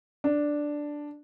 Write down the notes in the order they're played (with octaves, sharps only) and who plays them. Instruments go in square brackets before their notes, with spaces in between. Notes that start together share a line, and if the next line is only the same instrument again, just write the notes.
[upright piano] D4